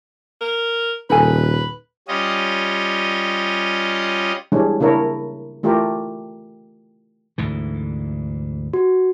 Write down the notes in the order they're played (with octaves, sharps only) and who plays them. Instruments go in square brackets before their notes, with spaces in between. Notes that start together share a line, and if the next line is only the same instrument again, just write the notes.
[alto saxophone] A#4
[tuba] D#1 [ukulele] D#4 A4 G#5 [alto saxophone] B4
[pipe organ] G3 C#4 F4 D#5
[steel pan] E3 G3 G#3 C#4 D4
C#3 A#3 D4 E4 A#4 C#5
E3 A3 F4 G4 A#4
[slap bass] D2 G#2 E3
[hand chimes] F#4